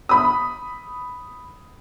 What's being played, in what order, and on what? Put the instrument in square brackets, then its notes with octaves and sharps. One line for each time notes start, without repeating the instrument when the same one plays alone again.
[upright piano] B5 D#6